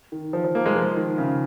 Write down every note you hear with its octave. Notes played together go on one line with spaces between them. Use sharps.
D#3
F3
F3
A#3
G#3
F3
D#3
C#3